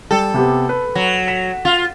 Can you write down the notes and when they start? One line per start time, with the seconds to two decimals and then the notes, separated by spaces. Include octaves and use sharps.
0.11 G3 A4 G5
0.34 C3 B3 G4
0.69 B4
0.95 F#3
1.28 B6 E7
1.65 F4